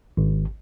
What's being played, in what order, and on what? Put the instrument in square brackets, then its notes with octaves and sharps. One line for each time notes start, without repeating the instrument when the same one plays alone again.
[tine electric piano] G#1